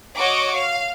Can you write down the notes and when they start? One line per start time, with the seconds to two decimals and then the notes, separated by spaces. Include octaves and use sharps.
0.17 F#4 C#5 D#5 C#6 D6
0.53 F5